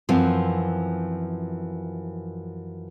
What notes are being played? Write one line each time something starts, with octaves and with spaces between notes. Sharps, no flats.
F#2 E3 F3 C4 F4